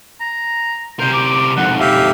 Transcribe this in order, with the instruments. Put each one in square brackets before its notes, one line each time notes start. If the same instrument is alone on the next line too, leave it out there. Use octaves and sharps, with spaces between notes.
[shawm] A#5
[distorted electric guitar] C3 A#4 [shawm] C5
[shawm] D6
[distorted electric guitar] F2 G#2 [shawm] F#5
[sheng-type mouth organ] G4 E5 [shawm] F5